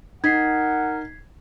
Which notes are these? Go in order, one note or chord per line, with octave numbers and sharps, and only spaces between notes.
D#4 A#4 F#5 G#6 B6 C7